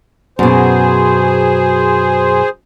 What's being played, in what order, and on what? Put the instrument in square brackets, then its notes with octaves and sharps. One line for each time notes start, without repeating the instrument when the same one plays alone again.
[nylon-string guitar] F#2 B2 [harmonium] G#4 C5